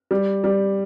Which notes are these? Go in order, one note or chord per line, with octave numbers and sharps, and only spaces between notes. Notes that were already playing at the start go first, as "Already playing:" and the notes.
G3
G3